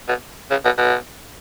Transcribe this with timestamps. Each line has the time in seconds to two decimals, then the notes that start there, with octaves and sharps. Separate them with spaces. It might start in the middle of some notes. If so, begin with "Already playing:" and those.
0.08 B2
0.50 C#3
0.65 B2
0.78 B2